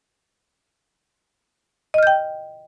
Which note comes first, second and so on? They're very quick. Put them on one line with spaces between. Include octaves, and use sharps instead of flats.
D#5 F6 G6 G5